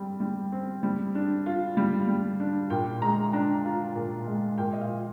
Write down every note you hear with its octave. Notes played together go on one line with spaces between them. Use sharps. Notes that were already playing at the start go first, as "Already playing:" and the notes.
Already playing: G3 C4 G5
G3
C4
G3
D4
F4
G3
G3
D4
A#2 G5
G#3 A#5
D4 A#5
F4
A#2
G#3
A#2 G5
D#5
F5
F3